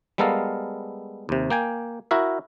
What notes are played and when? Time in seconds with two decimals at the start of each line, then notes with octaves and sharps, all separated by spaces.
0.18 G3 G#3 B3 A4 A#4 F5
1.29 D#2 C3
1.50 A#3 G5 G#5
2.11 E4 F#4 A#4 E5